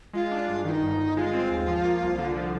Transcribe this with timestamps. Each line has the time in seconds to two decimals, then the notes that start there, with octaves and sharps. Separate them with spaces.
0.13 G#3 F4
0.32 D4
0.48 G2
0.65 D#3 F4
0.69 D#4
0.82 G1
0.99 G1
1.16 G#3 F4
1.33 C4
1.50 D#2
1.68 F3
1.85 A#3
2.02 C2
2.18 D3
2.35 F3